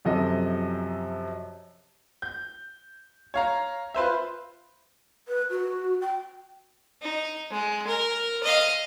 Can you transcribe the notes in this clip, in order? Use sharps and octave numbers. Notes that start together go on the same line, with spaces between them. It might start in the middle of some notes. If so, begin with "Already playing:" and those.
F#2 C3 F3 A4 D#5
G6
C#5 F5 A#5
F4 B4 C5 E5
B4
F#4
G5
D#4
G#3
A#4
D#5 F5